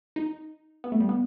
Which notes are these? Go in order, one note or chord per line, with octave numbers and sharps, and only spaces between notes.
D#4
B3
A3
G3
B3